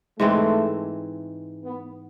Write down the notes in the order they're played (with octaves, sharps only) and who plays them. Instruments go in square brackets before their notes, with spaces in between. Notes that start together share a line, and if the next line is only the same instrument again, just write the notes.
[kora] G#2 E3 G#3 C4 [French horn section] A3
[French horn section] B3